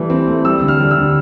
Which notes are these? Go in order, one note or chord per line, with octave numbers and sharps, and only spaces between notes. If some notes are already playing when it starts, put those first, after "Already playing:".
Already playing: E3 G3 A3
C4
A3
G3 E6
D3
F6
G3
E6
D3